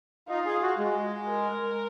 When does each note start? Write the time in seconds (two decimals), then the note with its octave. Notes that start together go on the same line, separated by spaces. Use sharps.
0.28 D#4 F4
0.45 G#4
0.62 F#4
0.78 G#3
1.29 A#4